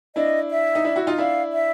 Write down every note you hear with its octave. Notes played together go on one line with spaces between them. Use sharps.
D4 E4 D#5
E5
D#4
D4 E4
E4 F#4
D#4 F4
D4 E4 F5
E5